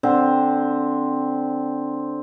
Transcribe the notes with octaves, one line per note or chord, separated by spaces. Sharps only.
D3 C4